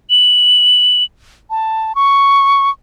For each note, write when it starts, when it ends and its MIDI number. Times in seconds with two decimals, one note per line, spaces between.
0.10 1.04 102
1.50 1.95 81
1.95 2.70 85